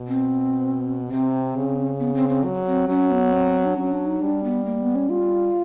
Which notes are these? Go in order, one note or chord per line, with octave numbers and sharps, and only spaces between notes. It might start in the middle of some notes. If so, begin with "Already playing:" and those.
Already playing: B2
C4
C3 C4
C#3
B3
C4
C4
F#3
C4
F#3 C#4
B3
C4
D4
F#3 C#4
D4
D#4
G3 D4
B3
A#3
B3
C#4
G3 F4